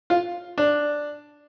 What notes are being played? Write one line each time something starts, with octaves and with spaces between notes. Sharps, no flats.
F4
D4